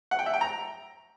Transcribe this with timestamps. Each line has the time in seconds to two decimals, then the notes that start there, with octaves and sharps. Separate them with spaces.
0.11 F#5
0.19 G5
0.26 E5
0.34 G5
0.41 A#5